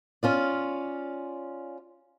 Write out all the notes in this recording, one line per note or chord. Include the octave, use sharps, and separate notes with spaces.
C#4 F4 D5